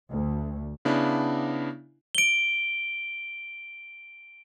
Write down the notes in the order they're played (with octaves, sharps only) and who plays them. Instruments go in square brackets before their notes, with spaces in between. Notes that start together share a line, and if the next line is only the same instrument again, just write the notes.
[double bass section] D2
[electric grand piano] C#3 B3 D4 E4
[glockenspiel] D7 G7